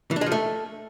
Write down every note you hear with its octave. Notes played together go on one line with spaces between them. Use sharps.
E3
D4
G#3
F3
A3